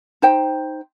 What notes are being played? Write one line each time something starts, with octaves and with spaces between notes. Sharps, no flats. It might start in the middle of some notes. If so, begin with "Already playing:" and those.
D#4 C5 G5